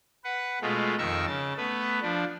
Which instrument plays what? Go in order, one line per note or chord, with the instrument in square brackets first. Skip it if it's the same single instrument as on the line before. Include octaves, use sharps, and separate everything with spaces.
[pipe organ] B4 F#5
B2 G#3 A3 F4
F2 D#3 A#4 C#6 E6
C#3 A5
A3 B3 B4
F3 D4